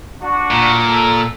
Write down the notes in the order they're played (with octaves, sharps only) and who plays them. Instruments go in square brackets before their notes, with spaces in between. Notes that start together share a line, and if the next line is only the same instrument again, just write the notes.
[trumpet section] D4 F#4
[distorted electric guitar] A#2
[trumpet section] A4